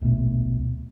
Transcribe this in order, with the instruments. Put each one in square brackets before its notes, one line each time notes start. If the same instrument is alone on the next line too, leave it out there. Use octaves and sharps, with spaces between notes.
[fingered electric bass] D1 A#1 B2 A3